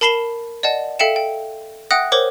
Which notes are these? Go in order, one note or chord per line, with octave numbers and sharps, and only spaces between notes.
A#4 A5 B5 C7 E7 G7
D5 D#5 F#5 A5
A4 E5 F5 G5 C#7 E7
G5
E5 F#5 G5 D#6 F#6 A#6
A#4 C5 C#5 D6